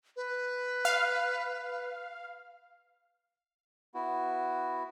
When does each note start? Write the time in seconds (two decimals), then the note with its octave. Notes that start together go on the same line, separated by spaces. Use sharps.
0.16 B4
0.85 F5
3.95 B3 E4 F#4